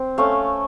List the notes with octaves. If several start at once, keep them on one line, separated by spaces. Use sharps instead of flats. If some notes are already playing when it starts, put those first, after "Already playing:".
Already playing: C4
A3 C#4 F5